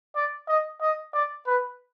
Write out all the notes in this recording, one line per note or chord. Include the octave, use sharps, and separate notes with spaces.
D5
D#5
D#5
D5
B4